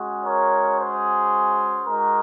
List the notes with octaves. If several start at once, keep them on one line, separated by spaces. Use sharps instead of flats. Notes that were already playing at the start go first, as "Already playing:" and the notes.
Already playing: G#3 C#4 F#4
A#4 C#5
G#4 C5
G#3 D#4 F#4 A#4